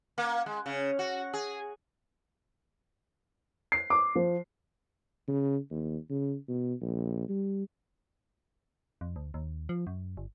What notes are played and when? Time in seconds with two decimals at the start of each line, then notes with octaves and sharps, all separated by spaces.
0.18 A#3
0.46 G#3
0.66 C#3
0.99 F#4
1.33 G#4
3.72 C7
3.90 D6
4.15 F3
5.28 C#3
5.70 D#2
6.10 C#3
6.48 B2
6.81 A#1
7.29 G3
9.01 F2
9.16 D2
9.34 D#2
9.69 F3
9.87 F#2
10.17 G1